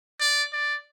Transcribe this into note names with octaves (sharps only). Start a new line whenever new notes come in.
D5
D5